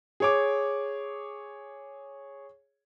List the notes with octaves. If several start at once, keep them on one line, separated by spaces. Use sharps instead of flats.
G#4 C#5 D6